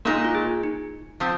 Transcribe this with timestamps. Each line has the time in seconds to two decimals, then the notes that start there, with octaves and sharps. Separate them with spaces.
0.05 A#2 G#3 A#3 D#4 A#4
0.25 F4
0.35 G#4
0.63 D#4
1.20 F3 C4